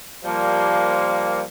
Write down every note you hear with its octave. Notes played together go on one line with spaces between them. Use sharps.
F3 G3 A#3